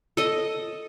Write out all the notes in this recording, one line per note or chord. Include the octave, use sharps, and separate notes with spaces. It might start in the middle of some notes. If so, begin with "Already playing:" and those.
A4 D#5